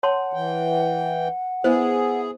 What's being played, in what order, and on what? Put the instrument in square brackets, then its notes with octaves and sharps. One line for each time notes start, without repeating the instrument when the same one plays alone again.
[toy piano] C#5 A5 C6 [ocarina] F#5
[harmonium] E3 G5
[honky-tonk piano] B3 E4 [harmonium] G#4 [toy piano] C5